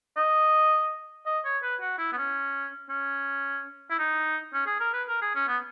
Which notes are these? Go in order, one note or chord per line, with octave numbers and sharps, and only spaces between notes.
D#5
D#5
C#5
B4
F#4
E4
B3
C#4
C#4
E4
D#4
C#4
G#4
A#4
B4
A#4
G#4
C#4
B3